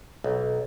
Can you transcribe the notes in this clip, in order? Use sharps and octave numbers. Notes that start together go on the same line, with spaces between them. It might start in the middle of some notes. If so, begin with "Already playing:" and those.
B1